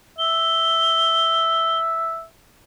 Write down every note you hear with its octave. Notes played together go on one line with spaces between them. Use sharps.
E5 G7